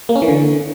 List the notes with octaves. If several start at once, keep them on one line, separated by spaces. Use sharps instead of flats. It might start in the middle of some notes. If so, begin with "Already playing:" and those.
A#3
C#4
E3
D3